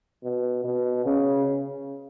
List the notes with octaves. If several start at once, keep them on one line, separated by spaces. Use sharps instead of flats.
B2
B2
C#3